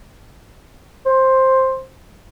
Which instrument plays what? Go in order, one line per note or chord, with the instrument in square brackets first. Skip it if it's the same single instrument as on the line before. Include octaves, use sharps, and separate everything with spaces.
[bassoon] C5